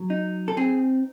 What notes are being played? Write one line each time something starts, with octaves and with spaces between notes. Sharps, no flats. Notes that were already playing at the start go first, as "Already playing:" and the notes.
Already playing: F#3
D#4
A4
C4 G#4